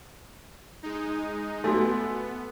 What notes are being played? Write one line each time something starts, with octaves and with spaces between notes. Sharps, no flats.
G#3 D#4
A3 B3 F#4 D5 G#5